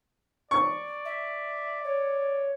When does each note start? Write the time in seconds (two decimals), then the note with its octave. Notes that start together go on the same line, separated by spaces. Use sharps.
0.51 D5 C#6
1.05 E5
1.84 C#5